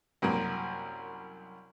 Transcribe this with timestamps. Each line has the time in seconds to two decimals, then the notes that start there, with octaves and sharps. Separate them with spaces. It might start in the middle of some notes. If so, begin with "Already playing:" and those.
0.22 C2 F#2 A#3